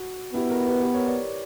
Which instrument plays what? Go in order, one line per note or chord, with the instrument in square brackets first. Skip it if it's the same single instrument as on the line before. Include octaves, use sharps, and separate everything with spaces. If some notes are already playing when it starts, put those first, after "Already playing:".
Already playing: [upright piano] F#4
[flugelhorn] B3 [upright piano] E4 G4
[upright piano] F#4 A#4
G4 B4
G4 B4
A#4 C#5
B4 D5